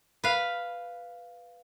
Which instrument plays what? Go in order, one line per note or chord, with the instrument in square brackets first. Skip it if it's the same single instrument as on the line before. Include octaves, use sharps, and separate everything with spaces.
[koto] B4 F5